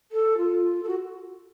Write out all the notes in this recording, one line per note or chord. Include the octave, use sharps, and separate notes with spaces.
A4
F4
A4
F#4